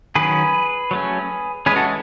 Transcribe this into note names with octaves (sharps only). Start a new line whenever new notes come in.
D#3 F#3 C#4 G#4 B4
F#3 A3 C#4
E3 G#3 C#4 G#4 B4
F#4 A4